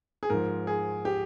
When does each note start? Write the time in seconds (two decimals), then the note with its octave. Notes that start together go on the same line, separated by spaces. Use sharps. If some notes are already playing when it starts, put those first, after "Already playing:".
0.23 G#4
0.30 G#2 F3 A#4
0.67 G#4
1.05 G4